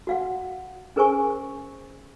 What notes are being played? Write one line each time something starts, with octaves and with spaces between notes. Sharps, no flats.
F#4 F5 F#5
C#4 G#4 A#4 C5 G#5 C#6